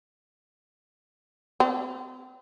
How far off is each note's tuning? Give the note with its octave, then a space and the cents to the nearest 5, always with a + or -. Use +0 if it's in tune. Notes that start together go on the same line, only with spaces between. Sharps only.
C4 -35